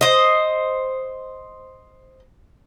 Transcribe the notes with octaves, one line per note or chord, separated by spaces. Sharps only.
C5 D#5